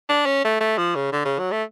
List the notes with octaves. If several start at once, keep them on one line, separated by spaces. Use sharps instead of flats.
D4
C#4
A3
A3
F3
C#3
D3
C#3
F#3
A3